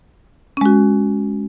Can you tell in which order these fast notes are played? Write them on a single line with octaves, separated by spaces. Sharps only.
C#4 G#3 F#4